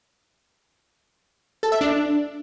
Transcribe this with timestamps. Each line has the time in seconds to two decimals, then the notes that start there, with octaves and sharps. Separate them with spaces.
1.63 A4
1.72 E5
1.81 D4